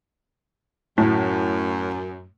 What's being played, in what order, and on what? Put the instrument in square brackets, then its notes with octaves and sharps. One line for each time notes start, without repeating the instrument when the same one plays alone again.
[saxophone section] F#2 [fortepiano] A2